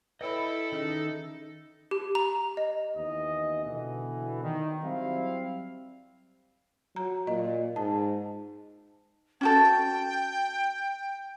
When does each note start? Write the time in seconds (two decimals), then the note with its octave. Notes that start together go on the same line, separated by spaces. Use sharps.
0.21 E4 A4 B4 C#5 D#5 G5 B5 E6
0.72 D#3 C#4 D#4 G#4 D#5
1.91 G4
2.15 A#5
2.57 D#5
2.96 D#2 E3 B3 D#5
3.64 B2 D3 E3
4.43 D#3
4.83 F#3 G3 C4 E4 F5
6.96 F#3 A#5
7.27 A#2 D#5
7.76 G#2 A5
9.41 C#4 F#4 A4 G5